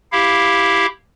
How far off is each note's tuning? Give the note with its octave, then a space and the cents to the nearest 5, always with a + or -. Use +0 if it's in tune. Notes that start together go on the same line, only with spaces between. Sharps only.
E4 +0 G4 +0 F5 +0